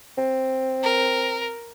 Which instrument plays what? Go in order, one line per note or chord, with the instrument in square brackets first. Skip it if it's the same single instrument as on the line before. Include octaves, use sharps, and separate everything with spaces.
[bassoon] C4
[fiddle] A#4